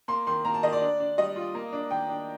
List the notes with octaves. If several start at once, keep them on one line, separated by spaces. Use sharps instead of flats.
A#3 C6
D#3 C6
A#3 A#5
A5
D#3 D#5
D5
D4
D4
G3 D#5
F4
A#3
D4
D#3 G5
D4